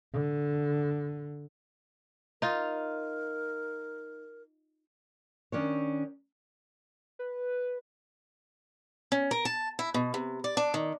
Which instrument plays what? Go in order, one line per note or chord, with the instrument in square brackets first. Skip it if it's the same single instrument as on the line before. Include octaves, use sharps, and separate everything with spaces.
[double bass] D3
[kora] D#4 F4 [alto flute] A#4
[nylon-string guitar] D#3 C#4 D4 C#5
[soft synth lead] B4
[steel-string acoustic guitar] C#4
A#4
A5
E4
B2
C3
D5
D4
D#3